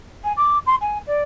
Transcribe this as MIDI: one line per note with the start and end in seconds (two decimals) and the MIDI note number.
0.24 0.33 80
0.37 0.58 86
0.66 0.75 84
0.81 0.98 80
1.07 1.23 74